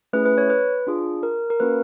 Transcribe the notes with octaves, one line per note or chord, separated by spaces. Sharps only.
A3 C#4 E4 G#4 B4
B4
C#5
B4
D4 F4 G#4
A#4
A#4
A#3 C#4 F#4 B4